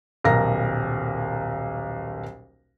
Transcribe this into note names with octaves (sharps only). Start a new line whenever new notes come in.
D#1 B1 A#4 A#5 A#6